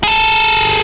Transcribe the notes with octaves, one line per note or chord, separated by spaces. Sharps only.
G#4 A4